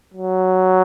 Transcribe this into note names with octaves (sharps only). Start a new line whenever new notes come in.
F#3